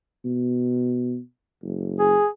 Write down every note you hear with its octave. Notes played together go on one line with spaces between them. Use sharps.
B2
F#1
G#4